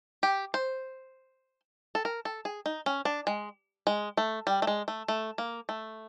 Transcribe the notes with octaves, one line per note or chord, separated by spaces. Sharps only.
G4
C5
A4
A#4
A4
G#4
D#4
C#4
D4
G#3
G#3
A3
G3
A3
G#3
A3
A3
A#3
A3